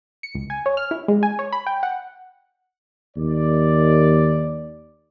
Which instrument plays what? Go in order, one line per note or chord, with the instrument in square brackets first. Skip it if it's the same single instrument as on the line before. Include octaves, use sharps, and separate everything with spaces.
[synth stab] C#7
C#2
G#5
C#5
F6
E4
G#3
G#5
C#5
B5
G5
F#5
[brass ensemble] D#2 D5